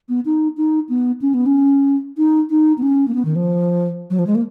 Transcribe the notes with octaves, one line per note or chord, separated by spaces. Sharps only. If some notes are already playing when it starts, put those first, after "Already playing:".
B3
D#4
D#4
B3
C#4
B3
C#4
D#4
D#4
B3
C#4
A#3
B3
D#3
F3
F#3
F3
G#3
A#3